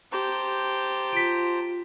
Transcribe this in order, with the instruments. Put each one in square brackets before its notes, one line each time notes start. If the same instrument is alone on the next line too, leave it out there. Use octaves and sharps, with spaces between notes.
[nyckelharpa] G4 [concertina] C5 A5 A#5
[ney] F4 [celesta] B6 D7